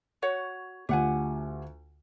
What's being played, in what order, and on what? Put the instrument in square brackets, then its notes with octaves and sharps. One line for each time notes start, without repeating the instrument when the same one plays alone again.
[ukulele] F#4 C#5 F#5
[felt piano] D2 F4 [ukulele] G4 F#5 G#5